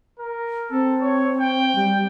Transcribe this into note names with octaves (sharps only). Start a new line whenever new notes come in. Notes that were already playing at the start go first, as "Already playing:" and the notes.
A#4
C4 A4
C#5
G5
G3